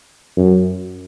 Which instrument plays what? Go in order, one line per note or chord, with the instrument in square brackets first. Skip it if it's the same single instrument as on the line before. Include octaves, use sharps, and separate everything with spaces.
[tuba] F#2